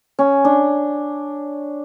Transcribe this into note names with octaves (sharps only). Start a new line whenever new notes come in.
C#4
D4